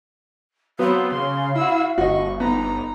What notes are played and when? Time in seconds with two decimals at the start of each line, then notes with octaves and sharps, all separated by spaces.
0.79 F#3 B3 C4 F5
1.12 C#3 C6
1.56 E4 F#4 E6
1.98 G1 F#4 D#5 C#6
2.40 B3 D#4 A#5